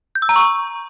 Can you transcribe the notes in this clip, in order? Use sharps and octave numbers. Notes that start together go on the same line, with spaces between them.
G6
E6
A#5
C#6